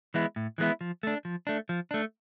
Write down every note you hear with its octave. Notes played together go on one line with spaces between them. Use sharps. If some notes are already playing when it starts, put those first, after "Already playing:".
E3 G#3 B3 E4
A2
E3 G#3 B3 E4
F3
A3 D4
F3
A3 D4
F3
A3 D4